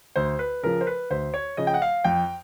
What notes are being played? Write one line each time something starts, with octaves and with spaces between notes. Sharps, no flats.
D2 C5
B4
C#3 F3 A#4
C5
B4
D2 C5
C#5
C#3 F3 D#5
G5
F#5
F5
F2 G5